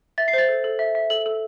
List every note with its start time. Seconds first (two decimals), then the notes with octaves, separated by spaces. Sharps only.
0.18 E5 A6
0.28 C7
0.33 C5 A6
0.49 A4
0.64 A4
0.79 E5
0.95 E5
1.10 A4 F#7
1.26 A4